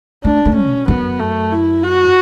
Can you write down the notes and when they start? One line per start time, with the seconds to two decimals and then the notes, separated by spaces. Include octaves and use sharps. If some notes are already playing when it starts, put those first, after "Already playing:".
0.24 A3 D4
0.45 A3
0.55 C#4
0.66 B2
0.88 F#2 B3
1.19 A3
1.52 E4
1.83 F#4